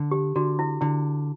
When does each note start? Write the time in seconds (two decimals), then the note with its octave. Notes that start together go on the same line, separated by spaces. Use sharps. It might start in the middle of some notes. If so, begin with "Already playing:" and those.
Already playing: D3
0.11 G4
0.36 D3 F#4
0.59 E4
0.81 D3 E4